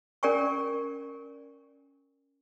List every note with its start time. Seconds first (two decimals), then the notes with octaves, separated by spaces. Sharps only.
0.23 C#4 A#4 D5 G5 G#5 C#6